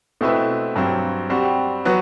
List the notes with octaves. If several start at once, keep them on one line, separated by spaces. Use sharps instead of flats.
B2 A3 C4 E4 B4
G2 F#3 C4
G3 C4 F#4
F#3 B3 F#4